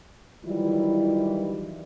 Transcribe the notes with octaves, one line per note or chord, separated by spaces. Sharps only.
D#3 E3 F#3 G3 E4 F4